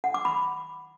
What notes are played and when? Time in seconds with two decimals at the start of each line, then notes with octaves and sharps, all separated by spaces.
0.04 F#5
0.14 D6
0.25 B5